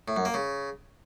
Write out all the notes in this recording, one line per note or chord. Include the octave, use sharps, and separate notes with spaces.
A2
F#2
A#3
C#3